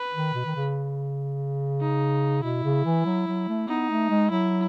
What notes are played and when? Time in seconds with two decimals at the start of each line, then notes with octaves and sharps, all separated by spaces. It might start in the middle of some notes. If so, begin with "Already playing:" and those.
Already playing: B4
0.14 D#3
0.34 B2
0.46 D#3
0.56 C#3
1.81 D#4
2.43 B2 E4
2.64 C#3
2.85 E3
3.05 F#3
3.27 F#3
3.48 A3
3.68 B3 D#4
3.90 A3
4.10 G#3
4.31 F#3 E4